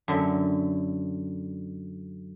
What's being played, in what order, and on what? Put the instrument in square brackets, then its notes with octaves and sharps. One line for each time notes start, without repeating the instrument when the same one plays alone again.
[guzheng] F#2 D3 E5